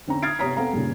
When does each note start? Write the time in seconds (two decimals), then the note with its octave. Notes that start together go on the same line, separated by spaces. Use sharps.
0.07 D3 C4 C#4 A#5
0.23 D#6 F6 G#6 A6 C7 D7
0.39 C3 B3 C#5 A#5 D#6 B6
0.57 B3 C4 A4 F5 A#5
0.73 G2 A#2 C#3